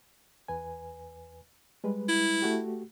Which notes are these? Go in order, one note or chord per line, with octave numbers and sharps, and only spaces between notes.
E2 B4 G#5
G3 G#3 B4
E4
A3 F#4 G4